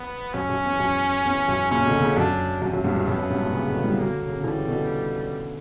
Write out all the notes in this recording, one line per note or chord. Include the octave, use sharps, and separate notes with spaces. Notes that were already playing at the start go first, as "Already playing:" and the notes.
Already playing: B3
F#2 C#4
F#2
E2
F#2
E2
F#2
A#2 C#3 C#4
B2 D3
A#2 C#3
F#2 D4
F#2
F#2
E2 G2
F#2
F#2 B3
F#2
E2 G2
F#2 A#2
A#2 C#3
B2 D3
E3 G3
D3 F#3 A#3
C#3
D3
C#3 E3 G3
B2 D3